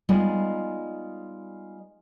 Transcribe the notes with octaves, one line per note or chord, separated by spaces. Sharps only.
G3 G#3 B3 D#4 F4 G#4